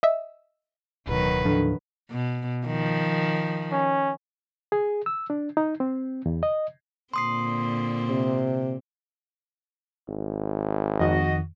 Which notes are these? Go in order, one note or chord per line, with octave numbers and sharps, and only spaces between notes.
D#5 E5
D1 B2 D#3 F#3 B4
D#2 A2 D3 F3
B2
D#3 F3
C#4
G#4
E6
D4
D#4
C4
E2
D#5
A#2 D3 C4 C6 D#6 C7
C3
G#1
F2 D#3 F#4 D#5